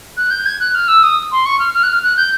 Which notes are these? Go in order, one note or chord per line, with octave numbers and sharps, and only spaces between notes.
F#6
G6
G#6
F#6
F6
E6
D#6
C6
C#6
F6
F6
F#6
F6
F#6
G6